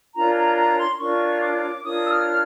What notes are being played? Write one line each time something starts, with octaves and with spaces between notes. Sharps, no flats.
D4 F4 A#4 C#5 A#5
A#5
A#5
C6
C6
D4 F4 A#4 C#5 C#6
D6
D4 F4 A#4 C#5 D#6
E6
F6